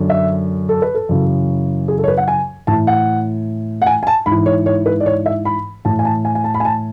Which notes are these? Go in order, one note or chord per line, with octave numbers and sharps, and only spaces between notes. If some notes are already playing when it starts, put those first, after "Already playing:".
Already playing: F#2 D3
E5
A4
B4
A4
F#2 C#3 E3
G#4
A4
C#5
B4
F#5
G#5
A2 E3 A5
F#5
F#5
G#5
G#5
A5
G#2 B5
E3
C#5
C#5
B4
D5
C#5
E5
B5
A2 E3 A5
G#5
A5
G#5
G#5
A5
B5
G#5
A5